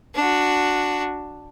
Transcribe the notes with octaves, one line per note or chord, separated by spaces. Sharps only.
D4 F#4